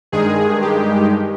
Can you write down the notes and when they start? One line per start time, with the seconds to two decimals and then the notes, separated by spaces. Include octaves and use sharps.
0.12 G2 D#3 G#3 G#4
0.62 G4